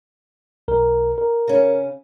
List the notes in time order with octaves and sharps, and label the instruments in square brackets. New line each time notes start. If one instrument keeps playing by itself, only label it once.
[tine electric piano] B1 A#4
A#4
[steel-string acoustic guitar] C#3 C#4